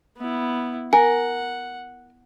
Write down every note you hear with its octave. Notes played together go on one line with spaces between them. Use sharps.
B3 E4
A#4 F#5 G#5